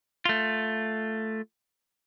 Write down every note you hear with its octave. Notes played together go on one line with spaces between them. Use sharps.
A3 F4